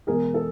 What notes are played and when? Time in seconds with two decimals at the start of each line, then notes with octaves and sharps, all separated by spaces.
0.07 E1 E2 B2 G#3 G#4 A#4
0.34 A4